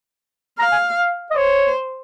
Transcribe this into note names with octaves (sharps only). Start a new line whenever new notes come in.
F5 A#5
G#5
F5
D#5
C5 C#5